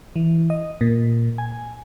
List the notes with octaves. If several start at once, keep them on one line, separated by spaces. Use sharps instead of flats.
E3
D#5
A#2
G#5